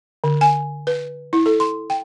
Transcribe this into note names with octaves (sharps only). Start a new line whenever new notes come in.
D3
G#5
B4
E4
A4
C6
G5